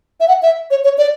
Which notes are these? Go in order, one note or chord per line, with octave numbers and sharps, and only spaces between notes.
E5
F#5
E5
C#5
C#5
D5